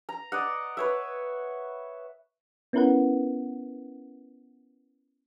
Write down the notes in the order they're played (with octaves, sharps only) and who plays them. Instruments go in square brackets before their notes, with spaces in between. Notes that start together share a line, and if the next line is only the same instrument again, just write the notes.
[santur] A#5
D5 D#5 F#5
B4 C#5 E5
[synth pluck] B3 C#4 E4 A#4 B4 F#5